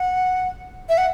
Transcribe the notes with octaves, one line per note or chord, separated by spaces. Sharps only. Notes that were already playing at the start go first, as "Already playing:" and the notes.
Already playing: F#5
E5
F#5